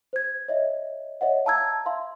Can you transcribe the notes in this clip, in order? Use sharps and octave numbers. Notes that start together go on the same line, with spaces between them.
C5 G#6
C#5 D#5 E5
C#5 D#5 E5 F#5
F5 A5 A#5 E6 G#6
E5 F5 C6